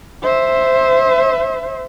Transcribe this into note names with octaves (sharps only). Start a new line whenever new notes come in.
C5 E5